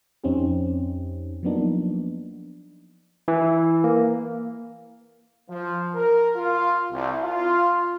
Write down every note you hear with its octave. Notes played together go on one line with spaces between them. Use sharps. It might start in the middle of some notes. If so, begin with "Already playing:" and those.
F2 C4 C#4 D#4 G4
F3 F#3 A#3 B3 D4 D#4
E3
A#3
F3
A#4
F4
C2
F4